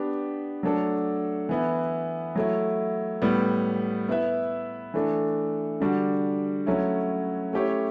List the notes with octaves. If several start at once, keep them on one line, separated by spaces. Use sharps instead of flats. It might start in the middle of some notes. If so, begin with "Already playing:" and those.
Already playing: B3 D4 G4
F#3 A3 D4 A4
E3 B3 E4
F#3 A3 E4
A2 G3 B3
B3 E4 B4 E5
E3 A3 D4 A4
D3 G3 D4 F#4
F#3 A3 C#4 E4
A3 C#4 E4 G4 C#5